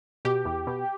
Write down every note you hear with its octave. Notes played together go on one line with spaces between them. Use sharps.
B2 G4
E2
B2